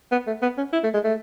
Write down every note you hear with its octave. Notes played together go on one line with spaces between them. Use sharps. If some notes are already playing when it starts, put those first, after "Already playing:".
B3
A3
B3
C#4
E4
A3
G#3
A3